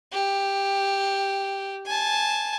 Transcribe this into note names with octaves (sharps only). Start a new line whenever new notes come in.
G4
G#5 A5